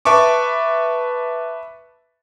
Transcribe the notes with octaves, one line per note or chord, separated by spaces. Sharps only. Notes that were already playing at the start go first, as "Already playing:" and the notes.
B4 E5 A5 C#6 D6